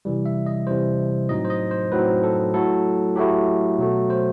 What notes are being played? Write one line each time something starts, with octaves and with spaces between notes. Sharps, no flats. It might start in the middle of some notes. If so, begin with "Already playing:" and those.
C3 E3 G3
E5
D#5
C3 E3 G3 C5
A2 F#3 C4 D#4 D#5
C5
D#5
C5
A2 F#3 C4 D#4 B4
A4
F#3 A3 E4 A4
F#3 A3 E4 G4
B2 F#3 A3
C5